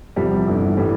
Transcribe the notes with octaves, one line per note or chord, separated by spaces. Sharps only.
E2 C3 F3 G3
G1 G2 E3
A2 E3 G3